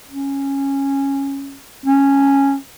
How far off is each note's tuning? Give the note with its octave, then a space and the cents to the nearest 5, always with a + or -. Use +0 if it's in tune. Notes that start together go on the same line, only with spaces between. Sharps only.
C#4 -10
C#4 -5